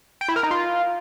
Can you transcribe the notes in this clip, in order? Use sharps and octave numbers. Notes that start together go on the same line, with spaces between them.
G5
E4
A#4
D#4
F4